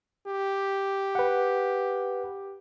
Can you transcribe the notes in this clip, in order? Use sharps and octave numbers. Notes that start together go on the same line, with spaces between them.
G4
B4 F#5